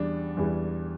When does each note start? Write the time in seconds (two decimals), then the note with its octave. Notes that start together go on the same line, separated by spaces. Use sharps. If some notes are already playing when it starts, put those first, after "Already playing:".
Already playing: E2 E3 G3 D4
0.37 E2 E3 G3